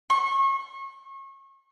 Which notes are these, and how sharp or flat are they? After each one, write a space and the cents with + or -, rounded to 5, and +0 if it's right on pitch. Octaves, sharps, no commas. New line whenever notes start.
C#6 -35